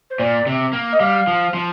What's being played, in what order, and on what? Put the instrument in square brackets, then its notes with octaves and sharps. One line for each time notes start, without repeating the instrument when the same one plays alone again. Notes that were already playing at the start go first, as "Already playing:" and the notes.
[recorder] C5
[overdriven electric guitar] A#2 [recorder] D5
[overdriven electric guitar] C3
A#3
[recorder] D#5
[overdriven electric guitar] G3 [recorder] F5
[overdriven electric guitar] F3
F3